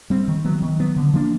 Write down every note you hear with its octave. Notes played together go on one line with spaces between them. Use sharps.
G3 C4
D#3
F#3 B3
D#3
F#3 B3
D3
F3 A#3 D4